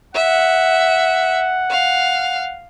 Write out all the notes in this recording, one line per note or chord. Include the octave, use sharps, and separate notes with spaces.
E5 F#5
F5